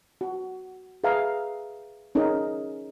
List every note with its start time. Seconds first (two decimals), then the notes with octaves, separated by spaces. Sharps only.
0.21 F#4
1.04 G#4 B4 E5 F5 G#5 A#5
2.15 C#4 D#4 G#4 A#4